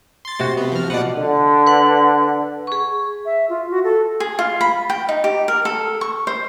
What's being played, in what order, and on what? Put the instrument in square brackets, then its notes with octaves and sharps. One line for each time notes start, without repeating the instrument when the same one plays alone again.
[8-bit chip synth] C6 A6
[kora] C3 F#4
[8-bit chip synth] B3
F3 F6
[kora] B2 F3 B4 [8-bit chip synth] D5 F#5
[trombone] D3
[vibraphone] B4 F#5
G#4 C#6
[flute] E5
F4
F#4
A4
[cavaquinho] G#4
F4
B5
G5
D#4
G4
A#4
A4
C#6
C5